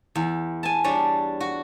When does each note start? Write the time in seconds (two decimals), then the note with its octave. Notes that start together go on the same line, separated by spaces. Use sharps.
0.15 E2
0.63 G#5 A5
0.84 G3 D4 C#5
1.41 F#4